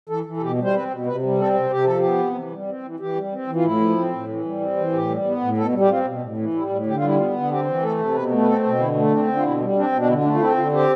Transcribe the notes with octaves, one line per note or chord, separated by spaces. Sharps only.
E3 A4
E3
A4
B2 G4
G3
C5
C4 B4
B2
C3 B4
G3
C4 A4
C3
C3 G4
F3 A4
G4
B3
C3
E3
G3
C4
E3
E3 G4
G3
C4
E3
F4
A2 E4
F3
C4
A2
E3
G3
C4
E3
A2 G4
G3
B3
A2
B2 A4
G3
G4
C4 F4
B2
A2
E3
G3 E4
A2
D3 G4
F4
G3 E4
B3 F4
D3
C4 G4
E3
A3 A4
C3
B2 B4
A3
B4
C4 A4
B2
D3 E4
A3
C4 D4
D3
F4
B2 E4
G3
C4 D4
B2
D4
D3 E4
A3 D4
F4
C4 E4
D3 F4
C4 G4